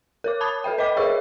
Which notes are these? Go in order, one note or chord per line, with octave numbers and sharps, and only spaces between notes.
A#4 C#5 D6
A5 B5 D#6 G#6 A6
A4 B4 E5 G5
B4 D#5 G5 B5 D6 B6
G#4 A#4 C#5 E5 C#6 E6